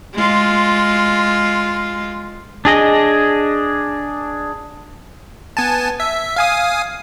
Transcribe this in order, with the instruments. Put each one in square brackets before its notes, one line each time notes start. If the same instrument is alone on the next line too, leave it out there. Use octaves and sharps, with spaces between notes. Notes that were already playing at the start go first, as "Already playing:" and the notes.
[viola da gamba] G#3 F4
[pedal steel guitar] D4 G#4 D#5
[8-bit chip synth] B3 G#5 A5
E5
F5 G#5 D#6